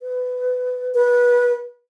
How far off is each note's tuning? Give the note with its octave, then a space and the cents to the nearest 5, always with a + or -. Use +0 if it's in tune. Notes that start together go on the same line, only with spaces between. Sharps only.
B4 +20
B4 -25